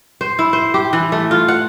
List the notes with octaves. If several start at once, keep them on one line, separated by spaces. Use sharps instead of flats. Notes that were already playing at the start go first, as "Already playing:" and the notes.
C5
E4
C5
G4
E3
A3
F4
F#5